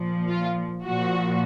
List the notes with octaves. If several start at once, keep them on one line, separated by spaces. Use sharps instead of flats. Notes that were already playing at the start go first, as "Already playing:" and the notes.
Already playing: A#2 F3
F4
A#2 F3 F#4